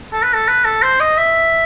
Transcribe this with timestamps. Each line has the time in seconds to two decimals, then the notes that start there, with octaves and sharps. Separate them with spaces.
0.12 A4
0.23 B4
0.34 A4
0.48 B4
0.65 A4
0.82 C5
1.00 D#5
1.17 E5